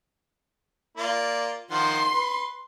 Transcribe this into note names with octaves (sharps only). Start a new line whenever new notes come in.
A#3 F4 D5
D#3 F3 F#5 C6
B4